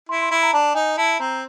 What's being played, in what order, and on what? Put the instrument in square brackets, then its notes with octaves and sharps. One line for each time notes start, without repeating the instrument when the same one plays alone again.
[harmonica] E4 [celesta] C6
[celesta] C6
[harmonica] E4 [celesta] B5
[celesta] A#5
[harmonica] D4 [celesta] A5
[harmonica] D#4 [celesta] G#5
[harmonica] E4 [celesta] A5
[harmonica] C4 [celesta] A#5